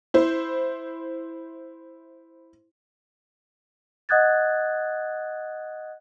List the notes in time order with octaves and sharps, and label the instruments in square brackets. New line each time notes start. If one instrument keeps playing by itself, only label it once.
[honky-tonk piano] E4 C5
[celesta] D#5 F#5 D#6 F#6 G#6 A6